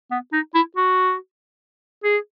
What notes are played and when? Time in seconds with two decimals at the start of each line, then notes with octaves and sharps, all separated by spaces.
0.11 B3
0.33 D#4
0.54 E4
0.76 F#4
2.04 G#4